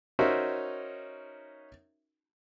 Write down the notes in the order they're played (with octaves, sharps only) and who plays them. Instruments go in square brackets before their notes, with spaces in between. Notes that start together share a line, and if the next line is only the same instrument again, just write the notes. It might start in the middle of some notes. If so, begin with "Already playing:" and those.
[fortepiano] C#4 D#4 F#4 A#4 C5 E5